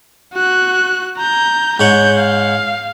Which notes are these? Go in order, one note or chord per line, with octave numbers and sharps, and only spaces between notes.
F#4 F#6
A#5 G6
G#2 C#5 F#5 G6
F5